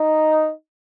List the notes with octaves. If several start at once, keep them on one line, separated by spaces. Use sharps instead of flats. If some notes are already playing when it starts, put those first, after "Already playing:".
Already playing: D#4